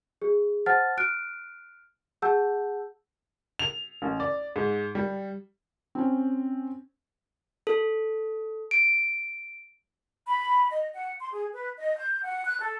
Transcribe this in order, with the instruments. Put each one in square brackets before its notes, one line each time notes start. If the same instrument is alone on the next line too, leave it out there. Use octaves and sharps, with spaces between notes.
[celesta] G#4
C5 F#5 A5 F6 A6
F6 F#6 D7
G#4 F#5 A5 E6 G6
[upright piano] F7
A1
D5
G#2
G3
[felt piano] C4 C#4
[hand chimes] A4
D7
[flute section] B5
D#5
F#5
C6
G#4
B4
D#5
G6
F#5
F#6
A4